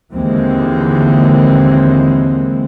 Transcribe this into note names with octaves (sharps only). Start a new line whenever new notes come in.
D#2 D3 E3 G#3 A#3 C4